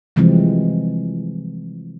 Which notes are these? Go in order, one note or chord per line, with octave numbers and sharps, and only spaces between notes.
C3 E3 F3 G3 G#3 C4